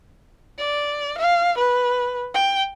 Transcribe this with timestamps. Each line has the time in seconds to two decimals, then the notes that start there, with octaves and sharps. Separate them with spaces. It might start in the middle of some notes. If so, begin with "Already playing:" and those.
0.58 D5
1.18 F5
1.57 B4
2.34 G5